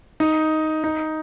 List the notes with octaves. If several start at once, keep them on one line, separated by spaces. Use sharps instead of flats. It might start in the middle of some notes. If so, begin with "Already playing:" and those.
D#4
D#4